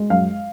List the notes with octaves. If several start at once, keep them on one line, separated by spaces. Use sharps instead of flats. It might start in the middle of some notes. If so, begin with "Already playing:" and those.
Already playing: G#3
F#2 F5